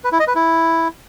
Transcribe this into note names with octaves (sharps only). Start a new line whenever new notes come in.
B4
E4
D#5
B4
E4